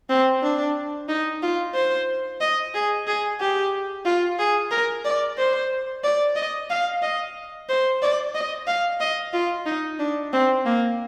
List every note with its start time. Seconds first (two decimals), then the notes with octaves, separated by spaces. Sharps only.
0.09 C4
0.43 D4
1.08 D#4
1.42 F4
1.74 C5
2.41 D#5
2.74 G#4
3.07 G#4
3.40 G4
4.05 F4
4.39 G#4
4.71 A#4
5.05 D5
5.38 C5
6.03 D5
6.36 D#5
6.70 F5
7.02 D#5
7.68 C5
8.02 D5
8.34 D#5
8.67 F5
9.00 D#5
9.33 F4
9.66 D#4
9.99 D4
10.33 C4
10.65 A#3